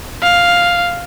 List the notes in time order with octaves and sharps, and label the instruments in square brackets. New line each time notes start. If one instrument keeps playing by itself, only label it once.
[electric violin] F5